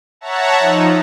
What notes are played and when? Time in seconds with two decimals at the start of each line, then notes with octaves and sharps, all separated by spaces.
0.21 C#5 E5 F#5 A5 A#5
0.59 F3 D#4